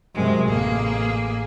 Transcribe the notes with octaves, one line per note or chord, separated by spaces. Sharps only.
F#2 C3 G#3
A1 A#3 G#4